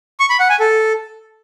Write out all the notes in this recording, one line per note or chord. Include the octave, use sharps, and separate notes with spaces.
C#6
B5
F#5
G#5
A4